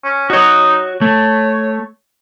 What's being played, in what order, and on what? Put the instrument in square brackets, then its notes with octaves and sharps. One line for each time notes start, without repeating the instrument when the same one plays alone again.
[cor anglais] C#4
[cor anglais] D#4 [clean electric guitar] F#4 C#5
[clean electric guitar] A3 [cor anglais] C#5